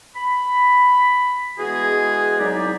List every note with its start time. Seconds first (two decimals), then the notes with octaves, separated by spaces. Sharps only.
0.16 B5
1.59 E3 G#3 B3 F#4 G#4
2.39 C2 F#3 D#4 E4 G4 D5